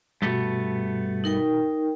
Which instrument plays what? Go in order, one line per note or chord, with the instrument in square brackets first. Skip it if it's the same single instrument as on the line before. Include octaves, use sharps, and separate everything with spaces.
[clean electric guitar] G2 A3 B3 [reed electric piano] B2 F#4
[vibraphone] D#4 A#4 G5